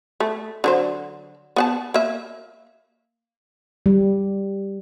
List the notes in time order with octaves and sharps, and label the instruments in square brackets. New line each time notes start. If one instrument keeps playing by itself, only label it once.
[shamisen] A3
D3 F#3 C5
B3 F#5 A5
A#3 E5
[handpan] G3